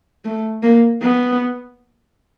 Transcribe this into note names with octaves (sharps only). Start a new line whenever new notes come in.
A3
A#3
B3